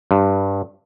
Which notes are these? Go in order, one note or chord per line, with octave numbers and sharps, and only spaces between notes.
G2